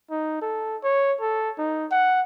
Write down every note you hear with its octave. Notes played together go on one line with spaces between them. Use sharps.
D#4
A4
C#5
A4
D#4
F#5